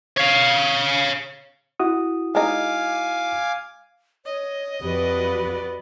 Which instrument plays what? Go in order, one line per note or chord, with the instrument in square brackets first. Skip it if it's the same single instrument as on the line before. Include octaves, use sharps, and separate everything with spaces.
[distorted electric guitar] C#5 F5
[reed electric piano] E4 F#4 D#6
[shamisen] G#3 D#4 [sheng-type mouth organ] F5 G#5 D6
[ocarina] C#5 [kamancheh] D#5
[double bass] F2 [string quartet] F#4 B4 D5 [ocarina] G4